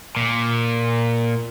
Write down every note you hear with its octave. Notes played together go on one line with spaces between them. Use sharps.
A#2